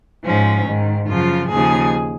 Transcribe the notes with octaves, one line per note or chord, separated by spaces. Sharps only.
G#2 F3 C#4
G#2 D#3
F#2 C#3 F3 F4
D#2 C#3 F3 G#4